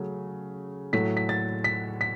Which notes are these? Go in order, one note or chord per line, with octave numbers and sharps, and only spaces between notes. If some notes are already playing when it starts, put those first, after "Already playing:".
Already playing: C#3 F#3 A3
A2 F#3 A3 B6
B6
A6
B6
B6